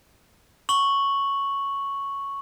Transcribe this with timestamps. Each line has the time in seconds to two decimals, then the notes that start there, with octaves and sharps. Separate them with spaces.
0.69 C#6 F#7